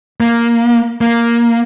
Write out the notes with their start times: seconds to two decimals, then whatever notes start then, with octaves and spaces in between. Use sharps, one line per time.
0.20 A#3
1.01 A#3